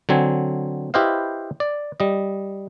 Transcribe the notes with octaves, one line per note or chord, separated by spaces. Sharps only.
D3 F#3 C4 G#5
E4 G4 B4 C5 D#5 F5
D5
G3 D#5